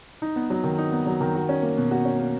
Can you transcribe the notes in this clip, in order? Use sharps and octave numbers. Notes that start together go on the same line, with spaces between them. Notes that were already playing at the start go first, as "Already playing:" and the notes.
D#4
B3
F#3
D#3
D#4
B3
F#3
D#3
F#4
C#4
A#3
B2
F#4
C#4
A#3